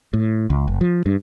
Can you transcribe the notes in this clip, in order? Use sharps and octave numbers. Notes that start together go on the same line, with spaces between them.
A2
C#2
F#1
F3
G2